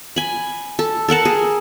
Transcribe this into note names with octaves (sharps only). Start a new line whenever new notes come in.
G#5 B5
A4
A4 A#4 F#5 A5
G#4